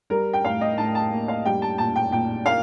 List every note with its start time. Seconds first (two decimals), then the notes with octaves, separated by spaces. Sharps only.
0.10 G3 A#4
0.33 G5
0.44 A2 F5
0.61 D#5
0.78 A2 A5
0.95 A5
1.12 A#3
1.28 F5
1.45 G3 G5
1.62 A5
1.78 A#2 A5
1.96 G5
2.12 A#2 G5
2.46 A#3 F5